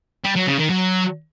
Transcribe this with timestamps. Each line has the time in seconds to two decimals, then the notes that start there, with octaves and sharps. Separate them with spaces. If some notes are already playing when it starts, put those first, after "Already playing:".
0.24 G3
0.36 F#3
0.47 C#3
0.58 D#3
0.70 F#3